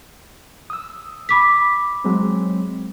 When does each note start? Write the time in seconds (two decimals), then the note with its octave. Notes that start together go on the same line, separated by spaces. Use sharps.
0.70 D#6 E6
1.29 B5 D6 B6
2.04 F#3 G#3 C4